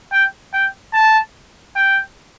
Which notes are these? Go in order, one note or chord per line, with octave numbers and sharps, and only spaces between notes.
G5
G5
A5
G5